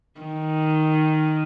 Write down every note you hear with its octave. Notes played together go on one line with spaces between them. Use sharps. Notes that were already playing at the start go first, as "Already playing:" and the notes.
D#3